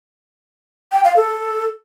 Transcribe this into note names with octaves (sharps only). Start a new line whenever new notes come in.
G5
F5
A4